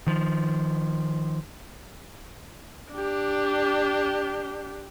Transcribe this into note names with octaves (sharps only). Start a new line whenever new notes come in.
D#3 F3
D4 G4